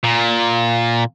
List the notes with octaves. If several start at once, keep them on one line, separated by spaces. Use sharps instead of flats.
A#2